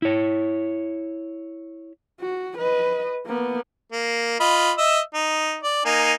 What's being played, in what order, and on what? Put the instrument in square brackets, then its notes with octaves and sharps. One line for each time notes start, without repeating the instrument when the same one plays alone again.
[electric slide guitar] E4 C#5
[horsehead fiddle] F#4
B4 D#5
A#3 B3
[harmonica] A#3
F4 D#5 B5
D#5 E5 E6
D#4
D5
A#3 D#4 G#5